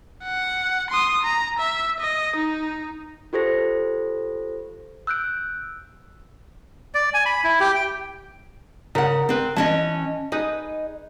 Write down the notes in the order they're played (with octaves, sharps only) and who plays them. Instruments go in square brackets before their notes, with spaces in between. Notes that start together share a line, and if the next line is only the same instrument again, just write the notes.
[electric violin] F#5
C6 D#6
A#5
E5
D#5
D#4
[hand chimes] F4 G4 A4 C5 A#6
E6 F#6 G6 D7
[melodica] D5
G#5
B5
E4
G4
G5
[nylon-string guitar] C#3 F#5 [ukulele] A#4
[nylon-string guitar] C4 B4
[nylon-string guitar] E3 C#4 D#5 [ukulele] A5
[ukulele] D#4 G#4 D#5 [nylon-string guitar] B4